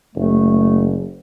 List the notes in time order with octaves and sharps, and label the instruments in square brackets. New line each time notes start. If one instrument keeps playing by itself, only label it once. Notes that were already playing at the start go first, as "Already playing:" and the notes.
[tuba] F#1 [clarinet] A3